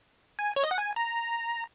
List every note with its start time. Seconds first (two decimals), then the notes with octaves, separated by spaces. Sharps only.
0.39 G#5
0.56 C#5
0.64 D#5
0.71 F#5
0.78 G#5
0.96 A#5